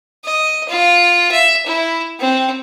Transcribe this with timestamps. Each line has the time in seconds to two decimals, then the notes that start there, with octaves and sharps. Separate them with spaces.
0.25 D#5
0.69 F4
1.32 E5
1.66 E4
2.20 C4